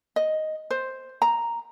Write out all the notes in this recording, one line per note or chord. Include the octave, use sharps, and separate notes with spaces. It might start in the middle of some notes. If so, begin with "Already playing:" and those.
D#5
C5
A#5